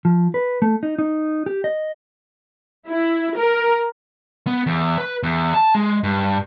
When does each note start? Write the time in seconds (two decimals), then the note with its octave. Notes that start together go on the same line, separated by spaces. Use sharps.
0.05 F3
0.34 B4
0.62 A3
0.83 D#4
0.98 D#4
1.46 G4
1.64 D#5
2.88 E4
3.37 A#4
4.47 B3
4.67 E2
4.98 B4
5.23 E2
5.54 A5
5.75 G#3
6.04 G2